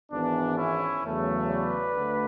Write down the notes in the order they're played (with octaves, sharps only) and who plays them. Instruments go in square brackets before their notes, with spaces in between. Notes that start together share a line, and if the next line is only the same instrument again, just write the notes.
[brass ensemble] G#1 G#2 E3 B3 D4
C#4 E4
E2 C#3 F#3 A3
B4 D5
D2 D3 A3